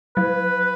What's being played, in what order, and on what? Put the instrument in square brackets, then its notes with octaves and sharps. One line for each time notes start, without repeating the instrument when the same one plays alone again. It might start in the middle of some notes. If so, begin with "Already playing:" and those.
[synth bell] F#3 [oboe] B4